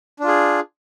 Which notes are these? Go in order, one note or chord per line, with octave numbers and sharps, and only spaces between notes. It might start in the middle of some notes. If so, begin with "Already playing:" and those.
D4 F4 G#4